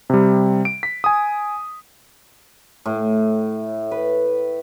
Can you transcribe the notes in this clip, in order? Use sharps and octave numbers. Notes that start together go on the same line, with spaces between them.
C3 G3
D7
B6
G#5 D#6
A2
B4